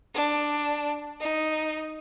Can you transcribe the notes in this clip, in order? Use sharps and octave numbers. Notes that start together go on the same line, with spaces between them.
D4
D#4